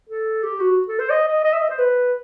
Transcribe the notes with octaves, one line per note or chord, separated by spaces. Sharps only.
A4
G4
F#4
A4
C5
D#5
D#5
D#5
E5
D#5
C5
B4